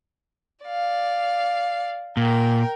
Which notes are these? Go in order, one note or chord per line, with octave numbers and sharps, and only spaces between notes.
D5 F5
A#2 A#4 G5